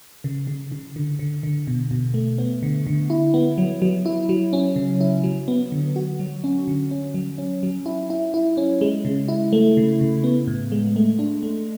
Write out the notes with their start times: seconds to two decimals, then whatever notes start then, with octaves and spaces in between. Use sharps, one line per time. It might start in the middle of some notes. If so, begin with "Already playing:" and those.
0.24 C#3
0.47 C#3
0.72 C#3
0.96 D3
1.19 D3
1.43 D3
1.67 B2
1.91 B2
2.14 A3
2.38 B3
2.63 D3
2.87 D3
3.10 E4
3.34 B3
3.58 F#3
3.82 F#3
4.06 E4
4.29 F#3
4.53 C#4
4.76 C#3
5.01 E4
5.24 F#3
5.48 B3
5.72 D3
5.96 F#4
6.19 F#3
6.44 C#4
6.67 D3
6.91 C#4
7.14 F#3
7.38 C#4
7.63 F#3
7.86 E4
8.10 E4
8.34 E4
8.57 C#4
8.81 G#3
9.05 C#3
9.28 E4
9.53 A3
9.77 C#3
10.01 C#3
10.24 B3
10.47 A2
10.72 G#3
10.96 A3
11.19 D4
11.43 A3